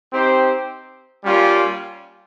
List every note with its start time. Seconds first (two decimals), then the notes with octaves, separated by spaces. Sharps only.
0.13 C4 D#4 G4 C5
1.25 G3 A#3 C#4 F4